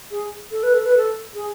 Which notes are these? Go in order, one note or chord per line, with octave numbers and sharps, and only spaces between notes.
G#4
A4
B4
A4
B4
A4
G#4